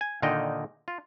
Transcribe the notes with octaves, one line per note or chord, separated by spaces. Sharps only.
G#5
A#2 D3 D#3 D#4 D#5 G5
F4